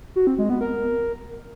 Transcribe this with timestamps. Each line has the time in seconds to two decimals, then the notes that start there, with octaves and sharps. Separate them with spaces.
0.16 F#4
0.27 C4
0.38 G#3
0.50 B3
0.61 A#4